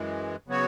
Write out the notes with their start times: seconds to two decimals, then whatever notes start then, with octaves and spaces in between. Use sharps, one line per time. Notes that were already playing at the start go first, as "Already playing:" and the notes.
Already playing: F#2 E3 G#3
0.47 C#3 F#3 B3 F#4 C#5